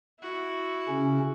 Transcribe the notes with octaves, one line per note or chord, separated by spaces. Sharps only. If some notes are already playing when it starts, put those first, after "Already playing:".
E4 F#4
C#3 C#4